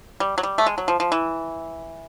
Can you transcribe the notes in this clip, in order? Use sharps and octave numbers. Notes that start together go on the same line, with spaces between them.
G3
F#3
G3
A3
G#3
F#3
F3
F3
E3